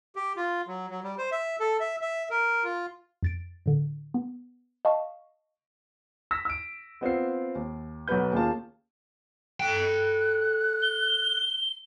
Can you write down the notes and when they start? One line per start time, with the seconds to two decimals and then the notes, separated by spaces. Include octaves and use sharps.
0.16 G4
0.37 F4
0.67 F#3
0.90 F#3
1.04 G3
1.18 C5
1.32 E5
1.60 A4
1.80 E5
2.01 E5
2.30 A#4
2.64 F4
3.23 F2 A6 D7
3.66 A2 D3
4.14 B3
4.85 D#5 F5 A5 C#6
6.31 E6 A#6 B6
6.45 E6 D7
7.01 B3 C4 F4 C7
7.55 D#2
8.08 B1 F#3 B3 B4 G6
8.32 D#2 A#3 C#4 F4 G#4 A5
9.60 A4 G5 F#6
10.82 G7